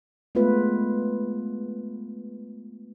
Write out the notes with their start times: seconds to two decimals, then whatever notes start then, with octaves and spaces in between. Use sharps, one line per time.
0.35 G#3 A3 B3 F4 B4